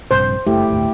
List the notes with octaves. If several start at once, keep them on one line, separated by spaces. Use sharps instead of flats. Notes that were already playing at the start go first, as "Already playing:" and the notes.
A#1 G2 C3 C5
F#1 A3 E4 G4
G1 D2 A2